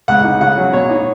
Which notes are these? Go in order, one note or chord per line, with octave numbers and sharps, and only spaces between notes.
C#2 F#5
D#4
C#3 F#5
F#3
B2 C#5
D#4